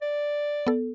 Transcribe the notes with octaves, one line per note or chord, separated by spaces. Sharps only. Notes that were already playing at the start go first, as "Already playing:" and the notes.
D5
B3 A4